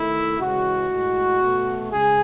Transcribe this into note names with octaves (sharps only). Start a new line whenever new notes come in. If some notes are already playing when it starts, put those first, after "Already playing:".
Already playing: D#3 A3 E4
C#3 E3 G#3 F#4
A2 G#3
B2 A3
C#3 G#3 G#4